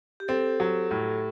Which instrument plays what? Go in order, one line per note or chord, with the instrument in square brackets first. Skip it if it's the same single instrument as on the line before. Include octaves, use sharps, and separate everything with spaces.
[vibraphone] G4
[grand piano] C4 [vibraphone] A4
[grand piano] F#3
A2